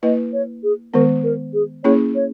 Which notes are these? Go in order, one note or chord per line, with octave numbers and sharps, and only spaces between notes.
A#3 E4 B4 D#5
C#5
G#4
D#3 G#3 B3 A#4
A#4
G#4
A#3 C#4 E4 G#4 C#5
C#5